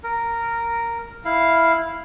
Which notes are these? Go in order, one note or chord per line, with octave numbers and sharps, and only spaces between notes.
A#4
E4 F5